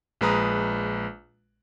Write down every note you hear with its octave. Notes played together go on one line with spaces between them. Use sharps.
A#1 G#3 B4 A#5 D#6